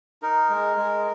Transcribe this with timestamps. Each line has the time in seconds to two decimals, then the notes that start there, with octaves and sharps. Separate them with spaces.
0.22 D#4 A#4
0.50 G#3
0.77 G#3